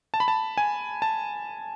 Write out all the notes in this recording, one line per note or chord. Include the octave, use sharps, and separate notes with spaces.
A5
B5
A5
G#5
A5